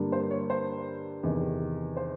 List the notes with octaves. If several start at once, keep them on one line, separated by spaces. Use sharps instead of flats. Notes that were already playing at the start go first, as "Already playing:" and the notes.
Already playing: G2 D3 G3 A#3
C5
C#5
C5
E2 C3 D#3
C5